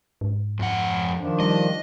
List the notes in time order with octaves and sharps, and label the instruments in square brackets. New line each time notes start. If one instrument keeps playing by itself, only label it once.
[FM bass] G#2
[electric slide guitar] F2 F#5
[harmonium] D#3 F3 D4
[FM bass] G3 [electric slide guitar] D#5